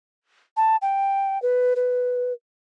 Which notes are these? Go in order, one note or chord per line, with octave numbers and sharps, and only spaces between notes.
A5
G5
B4
B4